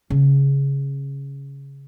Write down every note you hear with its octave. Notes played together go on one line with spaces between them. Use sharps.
C#3 C#4